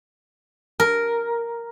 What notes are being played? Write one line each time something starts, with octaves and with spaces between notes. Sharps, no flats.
A#4